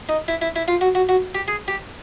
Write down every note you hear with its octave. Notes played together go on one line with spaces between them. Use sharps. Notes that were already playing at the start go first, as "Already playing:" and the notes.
D#4
E4
E4
E4
F4
F#4
F#4
F#4
G4
G#4
G4